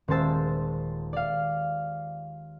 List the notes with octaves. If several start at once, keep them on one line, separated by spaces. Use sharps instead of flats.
D#1 G#3 C5 A5 E6
D5 F5